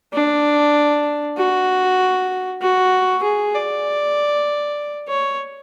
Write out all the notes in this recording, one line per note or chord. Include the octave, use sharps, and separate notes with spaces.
D4
F#4
F#4
G#4
D5
C#5